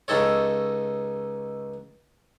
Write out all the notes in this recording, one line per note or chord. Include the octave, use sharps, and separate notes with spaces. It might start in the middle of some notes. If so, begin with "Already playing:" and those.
C#2 D#4 A4 C#5